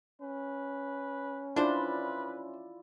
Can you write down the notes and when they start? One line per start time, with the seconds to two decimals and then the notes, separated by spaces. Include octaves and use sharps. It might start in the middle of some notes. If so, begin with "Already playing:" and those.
0.21 C#4 B4
1.56 D4 E4 F4 B4 C5 D5